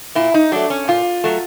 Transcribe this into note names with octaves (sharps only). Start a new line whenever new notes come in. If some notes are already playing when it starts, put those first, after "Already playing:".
A#2 E4
D#4
F#3 A3 D4
C#4
A#2 F4
F#3 A3